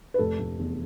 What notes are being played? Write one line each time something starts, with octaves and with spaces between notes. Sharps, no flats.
B4
F1 A4
F1
E2